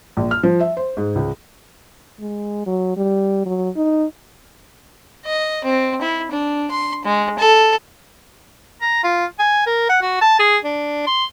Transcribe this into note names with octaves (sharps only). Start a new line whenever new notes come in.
A#1
F6
F3
E5
C5
G#2
C#2
G#3
F#3
G3
F#3
D#4
D#5
C4
E4
D4
C6
G#3
A4
A#5
F4
G#5
A#4
F#5
F#4
A5
G#4
D4
C6